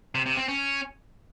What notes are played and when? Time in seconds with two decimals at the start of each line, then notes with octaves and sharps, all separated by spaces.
0.15 C3
0.26 C3
0.37 C4
0.48 C#4